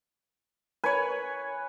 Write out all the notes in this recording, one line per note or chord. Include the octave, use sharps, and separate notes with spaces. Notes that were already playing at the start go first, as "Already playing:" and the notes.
B4 C#5 G#5